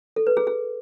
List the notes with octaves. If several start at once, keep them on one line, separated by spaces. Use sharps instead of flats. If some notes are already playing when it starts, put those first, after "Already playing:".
A4
B4
G#4
G#4